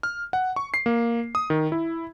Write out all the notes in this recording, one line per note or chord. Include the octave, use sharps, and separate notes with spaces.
F6
F#5
C#6
C7
A#3
D#6
D#3
E4